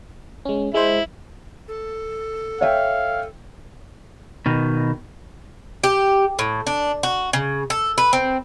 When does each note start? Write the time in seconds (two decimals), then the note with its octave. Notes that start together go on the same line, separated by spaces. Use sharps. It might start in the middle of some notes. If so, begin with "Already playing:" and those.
0.45 G#3 C#4
0.74 G#3 E4 C5
1.68 A4
2.61 C#5 E5 F5 G5
4.46 B2 D#3
5.84 G4
6.39 A2
6.67 D4
7.03 F#4
7.33 C#3
7.70 A4
7.98 B4
8.13 C4